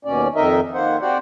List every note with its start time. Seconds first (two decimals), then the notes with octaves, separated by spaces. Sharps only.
0.05 D#2 B2 C#4 D5
0.35 F2 D#3 D#4 A#4 D#5 E5
0.74 D#3 A#3 C5 F#5
1.01 C4 F#4 G4 C5 D5 F#5